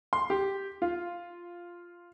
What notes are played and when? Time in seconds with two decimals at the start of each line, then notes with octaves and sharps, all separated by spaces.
0.13 C6
0.30 G4
0.82 F4